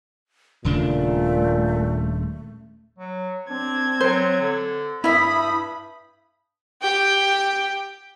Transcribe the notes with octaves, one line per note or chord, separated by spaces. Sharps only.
D#1 A#2 C#3 A3 D4
F#3
C4 D4 G#6
F#3 C5
D3
G2 E4 E5 B5 D#6
G4 G5